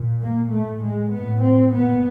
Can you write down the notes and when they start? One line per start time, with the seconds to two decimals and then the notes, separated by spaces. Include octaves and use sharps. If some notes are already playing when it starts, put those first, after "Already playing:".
Already playing: A#2
0.21 A#3
0.52 A2 A3
0.82 G#3
1.12 A2 B3
1.43 C4
1.73 A#2 B3